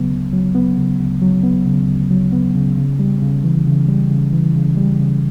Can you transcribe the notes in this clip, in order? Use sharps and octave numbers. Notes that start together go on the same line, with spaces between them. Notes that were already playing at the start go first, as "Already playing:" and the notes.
Already playing: D2 C#3 F#3 B3
D2
F#3
B3
C#3
D2
F#3
B3
C#3
D2
F#3
B3
C#3
C#3
G3
C#3
E3
C#3
G3
C#3
E3
C#3
G3
C#3